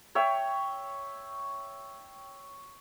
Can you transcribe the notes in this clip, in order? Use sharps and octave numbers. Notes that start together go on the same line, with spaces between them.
C#5 E5 G5